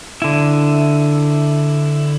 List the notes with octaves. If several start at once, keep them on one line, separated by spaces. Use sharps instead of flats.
D3 E4